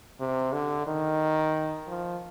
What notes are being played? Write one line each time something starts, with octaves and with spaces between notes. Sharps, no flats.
C3
D3
D#3
F3